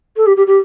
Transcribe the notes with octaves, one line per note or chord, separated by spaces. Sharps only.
A4
G4
G4
G4